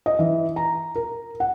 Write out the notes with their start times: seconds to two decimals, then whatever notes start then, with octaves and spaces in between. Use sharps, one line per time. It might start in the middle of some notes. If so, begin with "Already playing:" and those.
0.06 D#5
0.19 E3
0.56 A#5
0.96 A#4
1.40 F#5